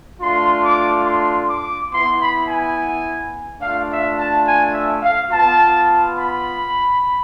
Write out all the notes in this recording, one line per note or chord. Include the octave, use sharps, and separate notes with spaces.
A3 D4 F4 C6
D6
C6
D6
B3 E4 C6
B5
G#5
A3 D4 F4 F5
E5
A5
G#5
E5
F5
B3 F4 A5
B5